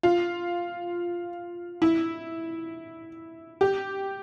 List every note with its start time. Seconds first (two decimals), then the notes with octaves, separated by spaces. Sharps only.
0.03 F4
1.82 E4
3.61 G4